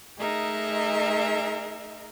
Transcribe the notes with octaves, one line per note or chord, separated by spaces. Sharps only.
A3 D#4 G#4 A#4 D#5 E5